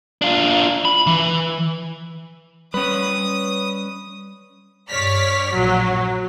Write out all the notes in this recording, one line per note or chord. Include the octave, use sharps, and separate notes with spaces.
D4 F4
B5
E3
G3 C#4 B4 D#6
G2 C#5 D5 F6 B6
A#1 F#3